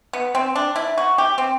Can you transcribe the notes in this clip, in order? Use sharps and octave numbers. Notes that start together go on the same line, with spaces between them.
B3
C4
D4
E4
F#4
G4
C4